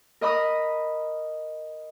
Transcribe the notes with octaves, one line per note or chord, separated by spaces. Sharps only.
A#4 D#5 B5 D#6